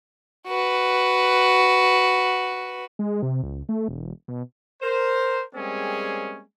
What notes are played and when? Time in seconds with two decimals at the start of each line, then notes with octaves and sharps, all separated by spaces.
0.47 F#4 B4
2.99 G#3
3.22 C3
3.43 C#2
3.69 A3
3.88 E1
4.28 B2
4.82 A#4 C5
5.54 G3 G#3 A#3 C4 C#4 G#4